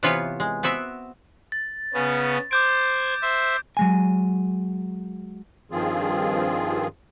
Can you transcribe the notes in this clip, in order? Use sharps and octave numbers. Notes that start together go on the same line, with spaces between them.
C3 E3 B3 F4 B4 C#5
G#3
B3 C4 F#4 E5
A6
C#3 B3 C#4
C5 D6 G6 G#6 D7
C5 E5
F#3 G#3 G#5
G2 D#3 F3 C4 F4 G#4